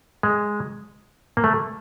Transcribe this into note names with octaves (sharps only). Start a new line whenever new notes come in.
G#3
A#3
A3